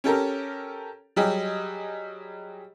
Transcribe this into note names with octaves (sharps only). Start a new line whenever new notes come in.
C#4 G4 A4 A#4
F#3 G3 G4 G#4 D#5